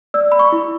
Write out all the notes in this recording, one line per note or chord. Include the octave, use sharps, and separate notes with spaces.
D5 E6
B5
C#6
E4